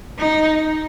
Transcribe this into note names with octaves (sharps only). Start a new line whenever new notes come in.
D#4